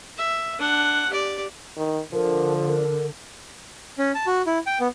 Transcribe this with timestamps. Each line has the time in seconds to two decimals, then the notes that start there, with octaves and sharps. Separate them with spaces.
0.17 E5
0.59 D4 F#5
1.10 G4 D5
1.77 D#3
2.13 D3 F3 A#4
2.68 A#4
3.98 C#4
4.15 A5
4.27 F#4
4.47 E4
4.66 G5
4.80 B3